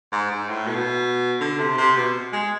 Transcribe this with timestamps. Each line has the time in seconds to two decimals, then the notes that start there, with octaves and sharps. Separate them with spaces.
0.12 G#2
0.31 G#2
0.49 A2
0.67 B2
1.41 D3
1.59 C3
1.77 C3
1.97 B2
2.33 G#3